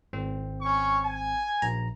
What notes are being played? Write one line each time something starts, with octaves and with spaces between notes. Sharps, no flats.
G#1 C4
C#4 C#6
G#5
A#1 A#5